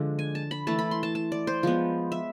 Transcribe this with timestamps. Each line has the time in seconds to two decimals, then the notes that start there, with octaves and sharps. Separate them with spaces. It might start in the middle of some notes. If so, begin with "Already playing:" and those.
Already playing: D3 F3 G#3 D4
0.19 G#5
0.35 A5
0.51 B5
0.67 E3 A3 E4 A5
0.79 B5
0.91 C6
1.03 A5
1.15 A5
1.32 D5
1.47 C5
1.63 F3 G#3 B3
2.12 E5